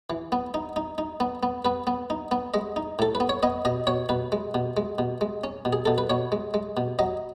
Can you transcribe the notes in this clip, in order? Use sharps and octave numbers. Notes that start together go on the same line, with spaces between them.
E3
B3
D#4
D#4
D#4
B3
B3
B3 B4
B3
D#4
B3
G#3 D#5
D#4
A2 A4
B4
B3
C#5
B3 D#5
B2 D#5
B2 C#5
B2 B4
G#3
B2
G#3
B2
G#3
C#4
B2
G#4
B2 A4
B4
B2 C#5
G#3
G#3
B2
F#3 D#5